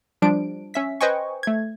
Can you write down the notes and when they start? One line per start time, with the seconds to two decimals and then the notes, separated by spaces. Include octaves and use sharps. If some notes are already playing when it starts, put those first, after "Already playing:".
0.22 F3 G3 D4 D7
0.74 C#4 E5 B6
1.01 B4 C5 D#5 G5 G#5 C#6
1.43 A3 G#6